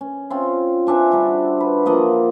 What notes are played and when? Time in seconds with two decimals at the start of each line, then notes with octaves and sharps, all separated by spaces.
0.01 C#4
0.30 C4 C#4 F4
0.87 C4 D4 E5 G#5
1.11 D3 G3 F#4
1.60 B4
1.86 F3 A#3 D#5 F#5